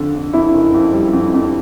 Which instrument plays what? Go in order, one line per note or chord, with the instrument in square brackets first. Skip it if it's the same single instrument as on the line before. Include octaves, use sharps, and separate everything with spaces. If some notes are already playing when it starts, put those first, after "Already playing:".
Already playing: [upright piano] F2 D3
D3
[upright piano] F2 [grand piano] E4
[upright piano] F#1
F2
G3
F2
F2